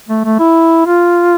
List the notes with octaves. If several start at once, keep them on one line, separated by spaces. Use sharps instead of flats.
A3
A3
E4
F4